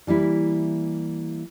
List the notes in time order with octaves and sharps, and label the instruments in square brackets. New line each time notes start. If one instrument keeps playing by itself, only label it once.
[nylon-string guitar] E3 G3 A#3 E4